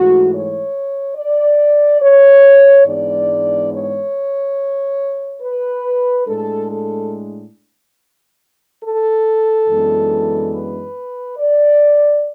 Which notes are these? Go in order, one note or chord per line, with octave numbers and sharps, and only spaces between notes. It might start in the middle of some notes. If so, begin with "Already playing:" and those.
Already playing: G#2 E3 A3 F#4
C#5
D5
C#5
G#2 E3 G#3 B3 D4 D5
C#5
B4
A2 G#3 D4 A4
A4
A4
F#2 E3 G#3 B3 D4
B4
D5